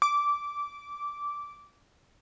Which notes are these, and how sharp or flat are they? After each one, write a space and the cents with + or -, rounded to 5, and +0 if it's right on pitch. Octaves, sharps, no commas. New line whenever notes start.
D6 -10